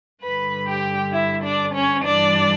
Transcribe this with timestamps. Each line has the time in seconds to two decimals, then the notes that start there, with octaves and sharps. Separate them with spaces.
0.22 G2 D3 B4 B5
0.67 G4 G5
1.13 E4 E5
1.43 D4 D5
1.74 C#4 C#5
2.04 G2 E3 D4 D5